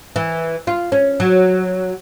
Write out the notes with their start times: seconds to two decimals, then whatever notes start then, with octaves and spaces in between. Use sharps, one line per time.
0.16 E3
0.67 F4
0.92 C#4
1.20 F#3